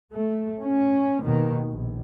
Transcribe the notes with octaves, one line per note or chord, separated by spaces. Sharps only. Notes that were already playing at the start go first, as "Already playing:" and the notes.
A3
C#4
D#2 B2 D#3
A#1